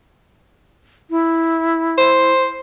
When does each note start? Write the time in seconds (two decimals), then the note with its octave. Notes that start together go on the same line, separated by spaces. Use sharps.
1.10 E4
1.98 C5